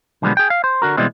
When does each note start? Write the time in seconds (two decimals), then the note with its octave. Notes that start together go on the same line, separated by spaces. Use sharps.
0.22 B1 D3 F3 G3 G#3 B3
0.37 G#4 G5
0.50 F5
0.64 C5
0.82 D3 F#4 A#4
0.97 B2 E3 G3 G#3 C4